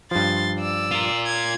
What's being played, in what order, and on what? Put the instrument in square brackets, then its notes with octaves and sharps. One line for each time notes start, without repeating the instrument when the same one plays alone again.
[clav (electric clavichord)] G2 F3 [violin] C6 A6
[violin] D5 E6
[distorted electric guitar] F4 A#4
[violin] G#6